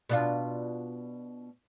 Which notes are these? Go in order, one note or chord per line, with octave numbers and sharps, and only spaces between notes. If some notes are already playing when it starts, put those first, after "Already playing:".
B2 D4 F4